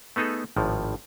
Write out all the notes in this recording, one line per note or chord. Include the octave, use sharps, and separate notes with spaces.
A3 B3 D#4 G#4 A4
G#1 A2 F3